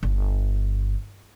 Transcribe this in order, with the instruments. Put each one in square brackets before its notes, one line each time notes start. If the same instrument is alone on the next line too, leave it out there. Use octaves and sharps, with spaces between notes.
[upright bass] G1